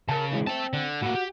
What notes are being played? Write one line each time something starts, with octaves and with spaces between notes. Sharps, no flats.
C#3 A#4 A5
C3 E3 G#3
C4 E5 A5
D3
A2 A#3 F#4
G4